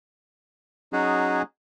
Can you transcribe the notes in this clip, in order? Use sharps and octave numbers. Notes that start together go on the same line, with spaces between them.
F#3 C#4 D#4 F#4 G#4